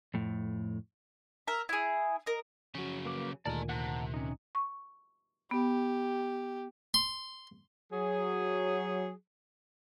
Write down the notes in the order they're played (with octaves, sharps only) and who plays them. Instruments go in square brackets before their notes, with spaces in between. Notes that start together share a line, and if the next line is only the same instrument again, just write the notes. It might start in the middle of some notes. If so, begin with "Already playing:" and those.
[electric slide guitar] F2 A2
[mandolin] A#4 E5
E4 G#4
A#4 D#5
[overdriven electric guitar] C#3 F#3 [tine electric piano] F3 F#4 [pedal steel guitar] C#4
[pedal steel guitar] A#3 B4 D6
[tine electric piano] D2 A#2 D#3 [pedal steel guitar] G#3 A#4 A5 [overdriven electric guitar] D5 G#5
[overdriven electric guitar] C3 [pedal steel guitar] F#5 A5 A#5
[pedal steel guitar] C#4 D#4
[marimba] C#6
[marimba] B3 [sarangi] G4
[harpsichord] C6
[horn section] F#3 G#4